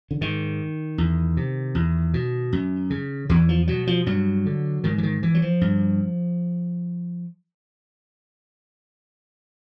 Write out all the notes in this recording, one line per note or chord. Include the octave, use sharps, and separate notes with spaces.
D3
G#2 D#3
E2
C3
E2
B2
F#2
C#3
E2 E3
F3
B2 F#3
F3
G2 F#3
D3
G#2 D#3
E3
D#3
E3
F#3
F3
G2